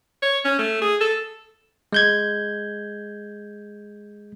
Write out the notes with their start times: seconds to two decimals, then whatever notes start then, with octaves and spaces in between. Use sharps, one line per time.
0.23 C#5
0.45 C#4
0.59 A3
0.82 G#4
1.01 A4
1.93 G#3 G6 G#6